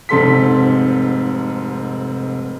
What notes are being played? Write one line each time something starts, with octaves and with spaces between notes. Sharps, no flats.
F1 G#2 C3 A4 C6 B6